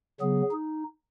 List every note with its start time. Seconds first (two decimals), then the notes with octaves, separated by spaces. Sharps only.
0.20 C#3 F#3 B3 G#4
0.51 D#4